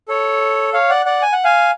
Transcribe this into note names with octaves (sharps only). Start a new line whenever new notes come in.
A4 C#5
C#5 F5
D5 F#5
D5 F#5
G#5
F#5
F5 G#5